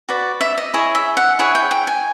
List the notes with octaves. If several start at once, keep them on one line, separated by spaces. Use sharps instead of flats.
F#4 B4 D5
E5
D#5
E4 G#4 C#5 D#5
E5
F#5
E4 G#4 C#5 F#5
G5
G5
G#5